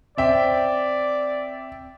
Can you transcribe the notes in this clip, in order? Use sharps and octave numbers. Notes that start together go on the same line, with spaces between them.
C4 D5 E5 G5